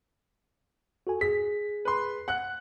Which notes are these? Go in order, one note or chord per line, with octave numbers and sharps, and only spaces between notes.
F#4 A4 G#5
G#4 B6
B4 C6
F#5 F#6